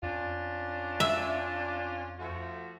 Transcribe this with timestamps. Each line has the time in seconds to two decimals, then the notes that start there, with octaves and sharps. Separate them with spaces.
0.03 F2 C#4 D4 F4
1.00 E5
2.19 F3 A3 F#4